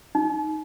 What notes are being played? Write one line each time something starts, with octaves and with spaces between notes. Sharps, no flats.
D#4